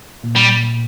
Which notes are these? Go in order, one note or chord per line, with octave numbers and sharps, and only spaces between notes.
A#2 A#3
G3